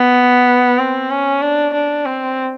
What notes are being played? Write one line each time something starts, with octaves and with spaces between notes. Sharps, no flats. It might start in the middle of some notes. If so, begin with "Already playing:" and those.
Already playing: B3
C4
C#4
D4
D4
C4